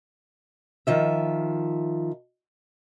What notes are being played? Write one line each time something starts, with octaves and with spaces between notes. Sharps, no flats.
D#3 F3 E5